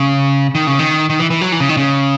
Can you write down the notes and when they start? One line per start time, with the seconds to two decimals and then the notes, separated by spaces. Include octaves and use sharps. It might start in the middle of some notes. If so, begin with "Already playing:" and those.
Already playing: C#3
0.55 D#3
0.67 C#3
0.79 D#3
1.10 D#3
1.20 E3
1.30 E3
1.41 F#3
1.52 E3
1.60 C#3
1.69 D#3
1.77 C#3